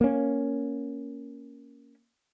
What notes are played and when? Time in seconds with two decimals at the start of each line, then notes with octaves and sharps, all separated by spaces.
0.01 A#3 C#4